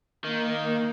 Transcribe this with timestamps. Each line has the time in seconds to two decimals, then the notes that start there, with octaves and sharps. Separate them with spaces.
0.25 D#3 A#3